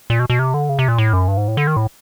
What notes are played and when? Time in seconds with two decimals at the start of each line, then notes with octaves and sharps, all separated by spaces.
0.10 A#2
0.19 B2
0.30 B2
0.39 C3
0.54 D3
0.69 C#3
0.79 C3
0.88 A#2
0.98 A2
1.13 F#2
1.28 G2
1.37 G#2
1.48 A2
1.57 D3
1.67 D#3
1.76 A2